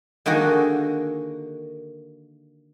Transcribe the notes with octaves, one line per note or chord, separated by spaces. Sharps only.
D3 D#3 A#3 F#4 G#4